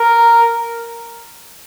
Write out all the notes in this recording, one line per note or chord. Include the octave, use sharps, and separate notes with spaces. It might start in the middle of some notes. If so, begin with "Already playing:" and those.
Already playing: A#4